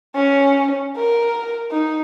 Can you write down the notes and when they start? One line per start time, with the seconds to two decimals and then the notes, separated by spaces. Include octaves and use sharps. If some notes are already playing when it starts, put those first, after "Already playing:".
0.15 C#4
0.96 A#4
1.72 D#4